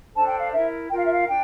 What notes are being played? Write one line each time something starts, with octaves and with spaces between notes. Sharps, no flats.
D4 A4 C5 A5
G5
F5
E4 A#4 E5
F4 A#4 G5
F5
E5
F5
D4 G5